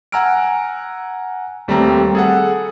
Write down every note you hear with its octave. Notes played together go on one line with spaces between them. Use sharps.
F#5 G#5 A#5 E6 F6 D7
D#2 G3 A3 C4 A#5
G#4 A4 F#5